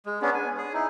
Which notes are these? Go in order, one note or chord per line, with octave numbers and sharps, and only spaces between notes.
G#3
B3 C#4 D4
G#5
G#4
D#4 E4